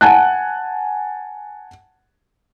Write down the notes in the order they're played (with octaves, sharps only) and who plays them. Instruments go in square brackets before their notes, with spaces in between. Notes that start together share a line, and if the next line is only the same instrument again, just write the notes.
[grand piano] F#5 G#5 A5 F#6